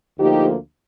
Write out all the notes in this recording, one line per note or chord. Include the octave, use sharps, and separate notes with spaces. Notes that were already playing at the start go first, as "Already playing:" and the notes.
D2 D3 F3 A#3 D#4 G4